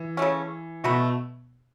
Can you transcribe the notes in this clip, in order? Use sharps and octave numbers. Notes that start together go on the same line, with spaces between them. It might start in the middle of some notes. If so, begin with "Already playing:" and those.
Already playing: E3
C#3 A3 C#4
B2 A3 F#4 B4